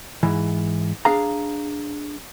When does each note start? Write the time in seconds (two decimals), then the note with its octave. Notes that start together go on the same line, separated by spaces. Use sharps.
0.23 G#2 E3
1.05 D4 G#4 F5 A#5